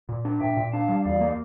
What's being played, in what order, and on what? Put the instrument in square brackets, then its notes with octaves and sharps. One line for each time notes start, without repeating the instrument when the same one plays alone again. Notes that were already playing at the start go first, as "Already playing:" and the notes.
[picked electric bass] A#2
D4
[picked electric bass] A#2 [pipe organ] E5 G5
[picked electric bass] A#2
[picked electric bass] D4 [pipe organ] F5 A5
[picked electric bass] G3
[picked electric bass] E2 [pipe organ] D5 F5
[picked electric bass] A#3